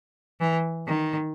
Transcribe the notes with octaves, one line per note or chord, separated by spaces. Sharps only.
E3
D#3